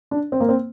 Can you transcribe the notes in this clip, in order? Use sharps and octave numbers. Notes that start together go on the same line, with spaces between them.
D4
C4
A#3
C4